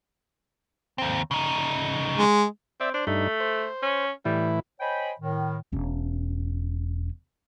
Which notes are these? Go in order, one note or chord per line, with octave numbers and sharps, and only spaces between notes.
D#2 C4
C#3 D#4
G#3
C4 D5 E5
D4 C5
G2 A3 D#4
C5
C#4
A2 E3 G3 E4
C5 C#5 D#5 G5 G#5 B5
A2 D#3
E1 C#4